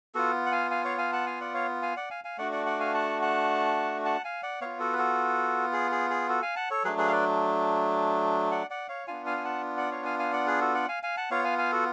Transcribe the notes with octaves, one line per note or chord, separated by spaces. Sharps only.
B3 F4 F#4 A4
F#5
F5 G#5
F5 G#5
C#5 F5
F5 G#5
F#5 A5
F5 G#5
D5 F#5
C#5 F5
F5 G#5
D5 F#5
F5 G#5
F5 G#5
A3 D4 F#4 D5 F#5
D5 F#5
D5 F#5
F5 G#5
F#5 A5
F#5 A5
F#5 A5
F5 G#5
D5 F#5
B3 F4 C#5 F5
F#4 A4
B4
F#4 A4
G#4
G#4
G#4
F#4 A4
F5 G#5
F#5 A5
A4 C#5
F#3 A3 D4 G#4 B4
G#4 B4
F5
B4 D5
D5 F#5
D5 F#5
C#5 F5
B3 D4 F4 F5 G#5
F5 G#5
G#5
F#5 A5
D5 F#5
C#5 F5
F5 G#5
F5 G#5
D5 F#5
G#4 B4
F#4 A4
D5 F#5
F5 G#5
F5 G#5
F#5 A5
B3 F4 C#5 F5
F5 G#5
F5 G#5
F#4 A4